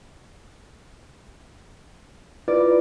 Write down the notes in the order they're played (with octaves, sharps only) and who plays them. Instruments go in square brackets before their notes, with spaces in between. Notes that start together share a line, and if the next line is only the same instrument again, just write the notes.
[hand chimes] E4 F4 B4 [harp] D5